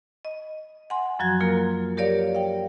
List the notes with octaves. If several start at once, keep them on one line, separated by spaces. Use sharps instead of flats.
D#5
F#5 G#5 C6
F#2 F3 F#3 F#4 G#6
A#3 F4 A#4
G4 A#4 C#5 D5 F5
F5 G5